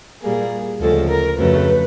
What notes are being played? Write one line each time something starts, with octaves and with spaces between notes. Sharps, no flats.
A#2 G3 A#3 G#4
D2 C#3 F3 G#3 A4
A#4
F2 C#3 F#3 A3 B4